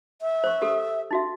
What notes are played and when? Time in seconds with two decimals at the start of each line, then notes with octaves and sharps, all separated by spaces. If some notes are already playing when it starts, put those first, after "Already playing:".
0.22 E5
0.44 C5 C#6
0.62 G4 A4
1.11 D#4 F#4 E5